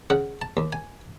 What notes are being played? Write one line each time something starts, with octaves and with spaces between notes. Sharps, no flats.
C#3 F#5
A5
D#2
G#5